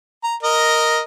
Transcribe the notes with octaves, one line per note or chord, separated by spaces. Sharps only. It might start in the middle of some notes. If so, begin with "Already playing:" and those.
A#5
A#4 D#5